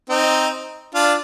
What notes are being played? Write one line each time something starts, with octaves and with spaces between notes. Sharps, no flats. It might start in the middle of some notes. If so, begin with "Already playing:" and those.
C4 D#4
D4 F4